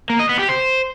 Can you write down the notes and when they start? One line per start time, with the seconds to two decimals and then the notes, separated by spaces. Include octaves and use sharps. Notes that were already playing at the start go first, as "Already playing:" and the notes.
0.10 A#3
0.19 D#5
0.29 B3
0.39 G4
0.49 C5